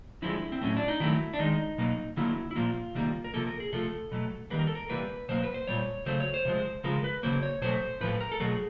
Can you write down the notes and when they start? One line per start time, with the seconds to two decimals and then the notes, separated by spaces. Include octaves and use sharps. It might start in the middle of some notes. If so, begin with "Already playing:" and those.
0.22 D3 F3 G#3 E4
0.52 C4
0.62 A2 F#3 A3 C#4
0.77 D4
0.88 D#4
1.00 D#3 F#3 A3 E4
1.34 D4
1.39 D#3 G#3 D#4
1.78 B2 F#3 A#3
2.17 D3 F#3 A#3 E4
2.51 E4
2.56 A#2 F3 A#3 F4
2.95 C3 D#3 G3 A#3
3.24 A#4
3.34 C3 F3 A#3 A4
3.47 A#4
3.60 G#4
3.73 C3 F3 A3 A4
4.12 B2 F#3 A3
4.50 D#3 G3 A#3 B4
4.59 A#4
4.67 A4
4.75 A#4
4.89 C3 E3 G3 A#3 B4
5.29 B2 F#3 A#3 C5
5.44 B4
5.54 C5
5.67 A#2 G3 C#5
6.06 C#3 F#3 A3 C5
6.20 C#5
6.34 C5
6.45 C3 F3 G#3
6.84 C#3 F3 G#3 A#4
7.04 B4
7.23 C#3 F#3 A#3 C5
7.43 C#5
7.62 B2 F#3 A3 C5
8.01 A2 F3 A3 B4
8.21 A#4
8.32 A4
8.40 B2 F#3 A3 G#4